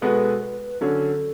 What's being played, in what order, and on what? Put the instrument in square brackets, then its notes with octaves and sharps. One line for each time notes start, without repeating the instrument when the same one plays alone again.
[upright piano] B2 G#3 B3 F#4 B4 [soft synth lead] A4
[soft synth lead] B4
[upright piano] D3 F#3 C#4 [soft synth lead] A4